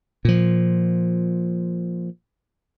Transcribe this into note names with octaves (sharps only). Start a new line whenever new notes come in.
A#2 F3